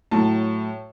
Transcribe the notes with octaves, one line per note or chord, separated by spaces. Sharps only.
A2 F#3 A5